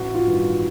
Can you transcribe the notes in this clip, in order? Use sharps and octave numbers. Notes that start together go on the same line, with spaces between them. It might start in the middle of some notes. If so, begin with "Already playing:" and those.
Already playing: A1 F#4
F4
G2 D#3